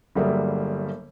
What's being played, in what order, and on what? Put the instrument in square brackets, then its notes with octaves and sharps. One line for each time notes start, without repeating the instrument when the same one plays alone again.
[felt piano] G1 F#3 G3 A#3 G#4 E5